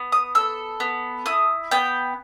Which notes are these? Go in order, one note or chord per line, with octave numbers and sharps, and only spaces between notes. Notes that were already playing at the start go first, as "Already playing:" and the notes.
Already playing: B3
D#6
A4 E6
B3
E4 D#6
B3 G5